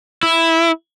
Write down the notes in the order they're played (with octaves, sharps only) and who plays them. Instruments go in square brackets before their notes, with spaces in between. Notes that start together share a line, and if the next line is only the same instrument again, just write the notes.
[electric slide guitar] E4